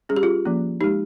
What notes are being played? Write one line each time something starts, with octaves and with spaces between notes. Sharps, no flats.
G3 C#4 G#4
G4
F4 G#4
F3 A#3 C#4
G#3 D#4 G4